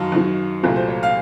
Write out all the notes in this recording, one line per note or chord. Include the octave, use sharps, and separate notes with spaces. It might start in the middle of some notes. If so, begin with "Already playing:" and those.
Already playing: F#2 D#3 F#3 F5 A5
F#2 D#3 F#3
C2 A#2 F#3 A3
C5
C#5
F5